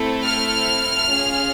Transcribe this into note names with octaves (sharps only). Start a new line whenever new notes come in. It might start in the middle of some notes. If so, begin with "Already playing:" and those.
Already playing: A3 C4 E4 A4
F6
C#4 F4 G#4